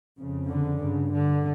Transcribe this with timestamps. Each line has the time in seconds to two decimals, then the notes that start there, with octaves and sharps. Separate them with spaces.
0.18 F2 C#3
0.49 D3
0.80 G2 C#3
1.13 D3